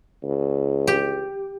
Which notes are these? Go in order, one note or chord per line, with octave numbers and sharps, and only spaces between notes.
C#2
G4